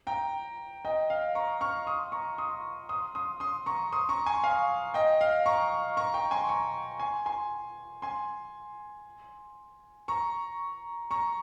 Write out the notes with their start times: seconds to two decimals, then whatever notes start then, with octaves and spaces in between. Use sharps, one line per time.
0.07 G5 A#5
0.85 D#5 G5
1.10 F5
1.35 A#5 C#6
1.61 C#6 F6
1.87 C6 D#6
2.12 A#5 C#6
2.38 C6 D#6
2.89 C6 D#6
3.15 C6 D#6
3.40 C6 D#6
3.66 A#5 C#6
3.92 C6 D#6
4.09 A#5 C#6
4.26 G#5 C6
4.44 F5 G#5
4.94 D#5 G5
5.21 F5
5.46 A#5 C#6
5.97 A#5 C#6
6.14 G5 A#5
6.31 G#5 C6
6.49 A#5 C#6
7.00 G#5 C6
7.26 G#5 C6
8.02 G#5 C6
10.08 A#5 C#6
11.11 A#5 C#6